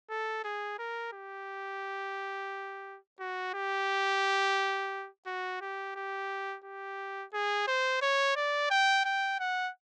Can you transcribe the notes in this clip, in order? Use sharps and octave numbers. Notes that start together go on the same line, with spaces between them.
A4
G#4
A#4
G4
F#4
G4
F#4
G4
G4
G4
G#4
C5
C#5
D5
G5
G5
F#5